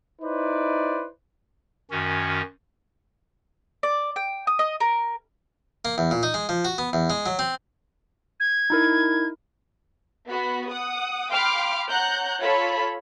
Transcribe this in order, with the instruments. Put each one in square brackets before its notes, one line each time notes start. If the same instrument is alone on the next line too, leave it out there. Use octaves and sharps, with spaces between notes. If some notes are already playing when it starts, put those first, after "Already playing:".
[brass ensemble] D#4 E4 B4 C5 D5
[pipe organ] F#2 D#3 C#4 F#4
[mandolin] D5
G5
D#6
D#5
A#4
[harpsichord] A#3
E2
A#2
D#4
G#3
F3
F#4
B3
E2
G#3
F#3
C4
[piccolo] G#6
[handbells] D#4 E4 A#4
[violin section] B3 F#4 B5
F#5 D#6
F5 G5 B5 C6 D6 F6
C#5 F#5 A#5 F#6 G6
F4 A4 C#5 B5